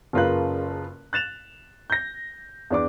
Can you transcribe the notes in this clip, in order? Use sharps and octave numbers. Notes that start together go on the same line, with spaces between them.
F#1 C#3 F4 A#4 B4 F#6
F#6 A6 E7 F7
G6 A#6
E2 D4 D6